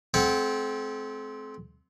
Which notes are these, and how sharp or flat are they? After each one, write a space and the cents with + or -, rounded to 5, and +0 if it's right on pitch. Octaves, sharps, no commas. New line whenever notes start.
A3 -45 C4 +0 F#5 +0